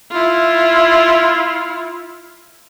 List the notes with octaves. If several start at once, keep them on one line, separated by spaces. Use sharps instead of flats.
E4 F4